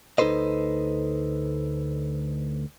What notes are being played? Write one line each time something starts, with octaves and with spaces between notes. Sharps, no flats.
D2 D#4 A4 B4 C5 D#5